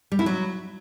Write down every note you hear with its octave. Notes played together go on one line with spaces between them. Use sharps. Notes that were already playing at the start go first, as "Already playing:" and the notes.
G3
E4
F#3